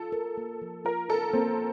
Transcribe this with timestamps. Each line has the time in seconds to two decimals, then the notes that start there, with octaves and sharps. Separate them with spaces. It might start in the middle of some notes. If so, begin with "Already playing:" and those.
Already playing: F4 A4
0.12 A#4
0.37 A#3
0.61 F3
0.85 F4 A#4
1.09 A4 A#4
1.33 A#3 C4